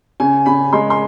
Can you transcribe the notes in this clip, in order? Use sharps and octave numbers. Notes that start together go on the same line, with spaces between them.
C#3 G#5
C#3 B5
G#3 C6
C6